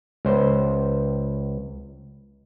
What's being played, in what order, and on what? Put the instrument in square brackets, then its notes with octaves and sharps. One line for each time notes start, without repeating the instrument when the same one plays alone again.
[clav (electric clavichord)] C#2 C5